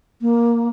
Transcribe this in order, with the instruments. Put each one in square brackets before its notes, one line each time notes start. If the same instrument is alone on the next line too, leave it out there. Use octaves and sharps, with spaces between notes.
[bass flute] A#3